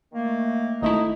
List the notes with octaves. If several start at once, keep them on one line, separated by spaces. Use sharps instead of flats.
D#3 A3 A#3
G#1 A3 D#4 E4